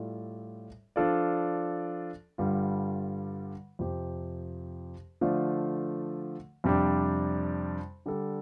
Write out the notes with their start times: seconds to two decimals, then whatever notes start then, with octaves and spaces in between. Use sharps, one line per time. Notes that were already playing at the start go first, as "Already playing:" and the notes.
Already playing: A2 G3 F4 A4 D5
0.96 F3 D4 F4 A4 D5
2.38 G2 D3 G3 F4
3.79 F2 C3 F3 C4 G4
5.21 D3 F3 A3 F4 D5
6.64 F2 C3 G3 D4
8.06 D3 G3 D4 A4